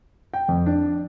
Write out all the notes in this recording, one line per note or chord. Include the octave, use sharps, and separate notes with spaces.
G5
F2
D4